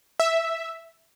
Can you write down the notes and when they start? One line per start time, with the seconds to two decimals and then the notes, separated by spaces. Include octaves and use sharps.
0.20 E5